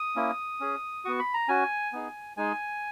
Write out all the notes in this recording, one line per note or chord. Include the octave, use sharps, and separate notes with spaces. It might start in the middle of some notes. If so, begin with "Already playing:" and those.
Already playing: D#6
A#3 C#4 E4
C#4 G#4
B3 F#4 C#6
B5
A#5
C#4 F#4 G#5
B3 D#4 G#4
G#3 D#4 G#4 G#5